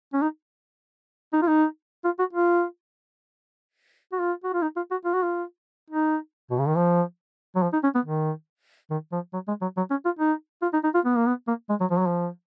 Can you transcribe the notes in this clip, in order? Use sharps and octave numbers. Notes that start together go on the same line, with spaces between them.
C#4
D#4
D#4
F4
D#4
F4
F#4
F4
F#4
F4
F#4
F4
D#4
F4
F#4
F4
F#4
F4
D#4
B2
C#3
D#3
F3
F#3
F3
D#4
C#4
B3
D#3
D#3
F3
F#3
G#3
F#3
F#3
C#4
F4
D#4
F4
D#4
D#4
F4
B3
A#3
B3
A#3
G#3
F#3
F3
F#3
F3